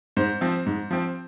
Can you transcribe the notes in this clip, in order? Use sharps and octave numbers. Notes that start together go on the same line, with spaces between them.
G#2 C5
F3 C4
G#2
F3 C4